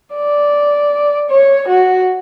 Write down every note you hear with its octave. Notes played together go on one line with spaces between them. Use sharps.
D5
C#5
F#4